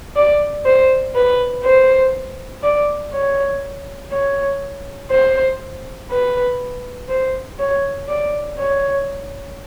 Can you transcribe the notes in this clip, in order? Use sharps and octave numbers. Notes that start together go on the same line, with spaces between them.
D5
C5
B4
C5
D5
C#5
C#5
C5
B4
C5
C#5
D5
C#5